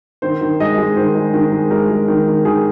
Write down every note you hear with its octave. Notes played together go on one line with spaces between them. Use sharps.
D#3 C5
D#3
G#3 D#5
G#3
D#3 C5
G#3
D#3
G#3
G#3 A#4
G#3
D#3
D#3
D#3 G#4